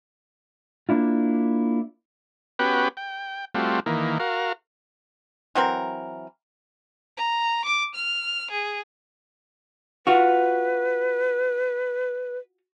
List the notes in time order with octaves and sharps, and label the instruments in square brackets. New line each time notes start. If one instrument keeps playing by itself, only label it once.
[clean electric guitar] A#3 D4 E4 F4
[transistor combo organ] B3 C#4 F#4 G4 B4 G5
G5
G3 A3 C4 F4 F#4
D#3 E3 A#3
F#4 A#4 F5
[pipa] E3 F#3 C4 A#4
[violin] A#5
D6
F6
G#4
[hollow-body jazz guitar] F4 F#4 [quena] B4